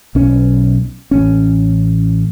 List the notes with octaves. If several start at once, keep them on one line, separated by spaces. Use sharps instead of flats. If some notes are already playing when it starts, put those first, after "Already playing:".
B1 C#4
A1 C#4